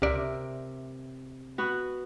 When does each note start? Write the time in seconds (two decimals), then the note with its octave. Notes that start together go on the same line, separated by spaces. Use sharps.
0.02 C#2 C3 A#4 D5 E5
1.58 B3 F#4